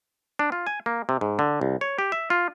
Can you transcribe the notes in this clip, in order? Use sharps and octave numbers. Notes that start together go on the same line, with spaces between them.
D4
F4
G#5
A#3
C3
G#2
D3
C2
C#5
G4
E5
F4